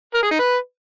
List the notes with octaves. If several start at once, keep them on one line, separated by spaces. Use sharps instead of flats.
A#4
G#4
D#4
B4